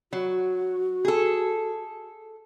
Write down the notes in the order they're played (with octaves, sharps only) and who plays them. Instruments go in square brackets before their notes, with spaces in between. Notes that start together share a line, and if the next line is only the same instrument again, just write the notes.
[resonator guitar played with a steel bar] F#3 [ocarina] F#4
[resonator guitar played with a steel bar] G#4 A4